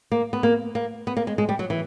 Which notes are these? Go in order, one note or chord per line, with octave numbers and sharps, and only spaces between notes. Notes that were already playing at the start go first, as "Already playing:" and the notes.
A#3
B3
A#3
A#3
B3
A#3
G#3
G#3
G3
F#3
E3